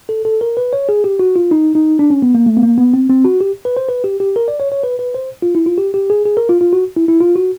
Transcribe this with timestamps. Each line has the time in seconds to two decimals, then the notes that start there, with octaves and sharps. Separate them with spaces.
0.09 A4
0.25 A4
0.41 A#4
0.57 B4
0.73 C#5
0.89 G#4
1.04 G4
1.19 F#4
1.36 F4
1.51 D#4
1.75 D#4
1.99 D4
2.10 C#4
2.22 B3
2.35 A#3
2.46 A3
2.57 B3
2.63 A#3
2.78 B3
2.93 C4
3.10 C4
3.25 F#4
3.41 G4
3.65 B4
3.77 C5
3.88 B4
4.04 G4
4.20 G4
4.36 A#4
4.48 D5
4.60 C#5
4.72 C#5
4.83 B4
4.99 B4
5.14 C5
5.42 F4
5.55 E4
5.66 F4
5.78 G4
5.94 G4
6.10 G#4
6.25 G#4
6.37 A#4
6.49 F4
6.61 F4
6.73 F#4
6.97 E4
7.08 E4
7.20 F4
7.36 F#4